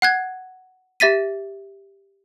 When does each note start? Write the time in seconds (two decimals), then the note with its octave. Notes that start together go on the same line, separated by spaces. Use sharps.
0.02 F#5 F#6 G#6
1.00 G4 E5 A6 B6 D#7